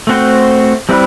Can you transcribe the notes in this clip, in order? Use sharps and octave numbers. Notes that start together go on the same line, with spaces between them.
A3 C4 F#4 C5
G3 C4 E4 B4